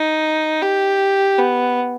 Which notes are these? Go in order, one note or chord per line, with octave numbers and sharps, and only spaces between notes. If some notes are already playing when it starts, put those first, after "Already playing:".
Already playing: D#4
G4
B3